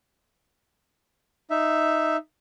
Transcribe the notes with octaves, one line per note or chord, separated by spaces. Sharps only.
D#4 E5